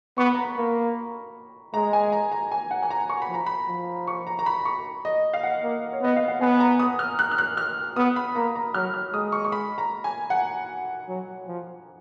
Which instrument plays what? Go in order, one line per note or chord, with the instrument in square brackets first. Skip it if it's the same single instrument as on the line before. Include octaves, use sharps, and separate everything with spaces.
[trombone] B3 [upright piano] C#6
[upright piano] B5
A#5
B5
[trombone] A#3
[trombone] G#3 [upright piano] A#5
[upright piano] G#5
A#5
A#5
G#5
F#5
G#5
A#5
C#6
B5
[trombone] F3
[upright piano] A#5
B5
[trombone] F3
[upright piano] C#6
A#5
A#5
B5
C#6
D#5
F5
F#5
[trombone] A#3
[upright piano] C#5
[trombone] B3 [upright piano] D#5
[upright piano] F5
F#5
[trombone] B3 [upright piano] G#5
[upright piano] A#5
D#6
F6
F#6
F6
F#6
F6
[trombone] B3 [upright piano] D#6
[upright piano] B5
[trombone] A#3 [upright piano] A#5
[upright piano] A#5
[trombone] F#3 [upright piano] F6
[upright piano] F6
[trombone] G#3 [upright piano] D#6
[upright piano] C#6
C#6
B5
A#5
G#5
F#5
[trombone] F#3
F3